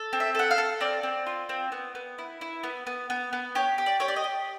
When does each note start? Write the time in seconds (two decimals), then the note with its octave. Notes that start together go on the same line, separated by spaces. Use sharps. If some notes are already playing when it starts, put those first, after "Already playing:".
Already playing: A4
0.13 C4
0.20 E5
0.35 A4 F#5
0.51 F5
0.58 A4
0.80 C4 D5
1.03 C4
1.26 F4
1.49 C4
1.72 B3
1.95 B3
2.18 E4
2.41 E4
2.63 B3
2.87 B3
3.10 B3
3.33 B3
3.55 G4 C#5
3.78 G4
3.86 D5
4.00 G4 C#5
4.08 D5
4.16 D#5
4.24 G4